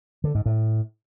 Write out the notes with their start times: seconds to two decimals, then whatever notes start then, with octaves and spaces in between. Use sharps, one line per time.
0.24 D3
0.35 G#2
0.46 A2